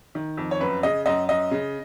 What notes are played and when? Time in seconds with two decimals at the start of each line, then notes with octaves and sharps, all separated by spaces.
0.15 D#3
0.37 F2
0.51 C#5
0.60 F#2 B4
0.83 C#3 D#5
1.06 F#2 D#5
1.29 F#2 D#5
1.51 C#3